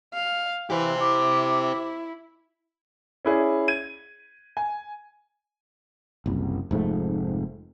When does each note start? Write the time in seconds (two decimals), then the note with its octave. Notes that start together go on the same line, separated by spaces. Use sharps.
0.14 F5
0.70 E3 G4 C5
1.00 E4 D6
3.25 C#4 E4 G#4 D5
3.68 G#6 D#7
4.57 G#5
6.26 F#1 C2
6.71 F1 G#2 F3 A3